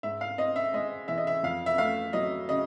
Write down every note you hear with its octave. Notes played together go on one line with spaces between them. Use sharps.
G#2 E5
F5
C4 D#5
E5
G#3 D#5
E3 E5
D#5
E5
F2 F5
E5
A3 F5
F#3 D#5
C#3 D#5